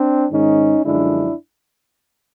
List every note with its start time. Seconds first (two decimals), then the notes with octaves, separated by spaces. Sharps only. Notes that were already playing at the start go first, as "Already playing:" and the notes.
Already playing: C4 D4
0.32 G#2 D#3 G#3 C#4 D#4
0.85 F#2 D3 F3 G#3 D4 E4